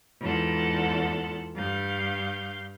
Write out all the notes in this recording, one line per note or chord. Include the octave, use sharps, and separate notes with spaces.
E2 G#2 F4 A4 F#5
G2 F5 G6